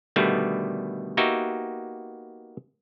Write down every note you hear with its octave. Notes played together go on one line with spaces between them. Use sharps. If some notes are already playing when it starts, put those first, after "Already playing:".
B2 D3 D#3 G3 A3 B3
A#3 B3 D#4 F#4 G4 E5